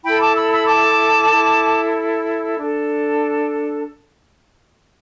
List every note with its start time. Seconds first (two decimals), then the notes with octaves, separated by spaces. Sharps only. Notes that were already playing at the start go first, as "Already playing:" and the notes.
0.04 E4 A4 G5 B5
0.20 A5 D6
0.36 B5 E6
0.51 B5 E6
0.67 A5 D6
1.30 E4 A4
2.57 D4 A4